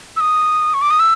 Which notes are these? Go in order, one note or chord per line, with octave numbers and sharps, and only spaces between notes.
E6
D#6
C#6
D6
D#6
E6